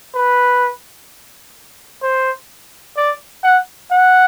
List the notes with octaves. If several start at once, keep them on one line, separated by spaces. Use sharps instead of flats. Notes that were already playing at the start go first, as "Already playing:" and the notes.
B4
C5
D5
F#5
F#5